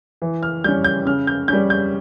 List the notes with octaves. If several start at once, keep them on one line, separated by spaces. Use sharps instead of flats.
E3
F6
G3 C#4 G6
G6
C#3 F6
G6
G3 C#4 G6
G6